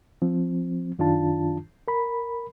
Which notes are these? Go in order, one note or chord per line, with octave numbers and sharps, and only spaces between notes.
F3 C4
F#2 D#3 D4 F4 A5
A#4 B5